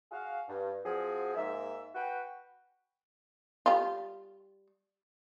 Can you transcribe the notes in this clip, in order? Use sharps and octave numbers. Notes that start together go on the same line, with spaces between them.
F#4 G#4 F5
G2
F3 C4 F#4 G#4
G#2 A#3 E5
F#4 B4 F#5 G5
G3 F4